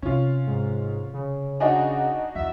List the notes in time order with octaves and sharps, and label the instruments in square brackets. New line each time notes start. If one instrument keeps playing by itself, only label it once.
[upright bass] C3 [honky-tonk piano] C#4 F4
[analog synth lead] G#2
C#3
[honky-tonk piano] D4 D#4 F#4 [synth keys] D#5 F#5 G#5
[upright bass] E2 E3 [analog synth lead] E5